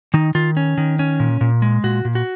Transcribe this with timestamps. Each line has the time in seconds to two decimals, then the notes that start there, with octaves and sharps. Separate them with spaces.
0.14 D#3 D#4
0.35 D#3 F4
0.57 C#4
0.78 D#3
0.99 C#4
1.20 A#2
1.41 A#2
1.62 G#3
1.84 A#2 F#4
2.05 A#2
2.15 F#4